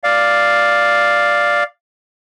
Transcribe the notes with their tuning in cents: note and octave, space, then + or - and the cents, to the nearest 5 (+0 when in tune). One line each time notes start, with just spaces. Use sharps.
D5 +0 F5 +0